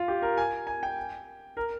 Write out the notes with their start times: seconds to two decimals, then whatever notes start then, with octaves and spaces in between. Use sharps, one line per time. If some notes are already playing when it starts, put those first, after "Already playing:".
Already playing: F4
0.08 G4
0.22 A#4
0.37 G#5
0.67 G#5
0.83 G5
1.57 A#4